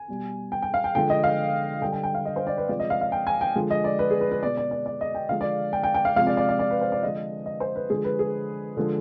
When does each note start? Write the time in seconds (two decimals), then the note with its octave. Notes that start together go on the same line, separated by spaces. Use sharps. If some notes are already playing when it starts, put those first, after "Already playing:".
Already playing: G#5
0.08 B2 G3
0.52 G5
0.62 G5
0.74 F5
0.84 G5
0.95 D3 F3 G#3 G5
1.10 D#5
1.24 F5
1.82 D3 G5
1.85 G3
1.93 G5
2.04 G5
2.15 F5
2.26 D#5
2.36 C5
2.47 D5
2.58 B4
2.69 C3 F3 G#3 D5
2.80 D#5
2.90 F5
3.01 F5
3.12 G5
3.27 G#5
3.41 G5
3.55 D3 F3 G#3
3.71 D#5
3.84 D5
3.99 B4
4.10 G#4
4.21 B4
4.31 B4
4.42 B2 G#3 D5
4.57 D5
4.71 D5
4.86 D5
5.01 D#5
5.15 G5
5.29 D3 F3 G#3 F5
5.41 D5
5.73 G5
5.84 G5
5.94 G5
6.05 F5
6.16 C3 F3 G#3 F5
6.27 D5
6.37 D5
6.49 D5
6.59 D5
6.70 B4
6.81 C5
6.92 D5
7.03 D3 F3 G#3 D#5
7.46 D#5
7.60 C5
7.76 B4
7.90 D3 F3 G#3 G#4
8.04 B4
8.19 G#4
8.77 D3 F3 G#3